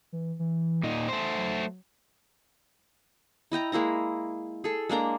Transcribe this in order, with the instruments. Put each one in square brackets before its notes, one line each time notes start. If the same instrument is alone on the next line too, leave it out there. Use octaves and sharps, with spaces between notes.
[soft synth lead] E3
E3
[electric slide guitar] A#2 D#4 [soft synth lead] A#6
[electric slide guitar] A3 C5
[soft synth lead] F#3
[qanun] E4 D#5 G5 A#5
G#3 A#3 E4 A#5
G#4 A4
G#3 A#3 D4 A#5